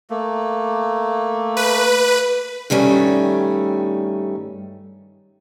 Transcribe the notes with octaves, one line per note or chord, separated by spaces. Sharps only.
A3 A#3
B4
G2 D#3 G3 A3 C#4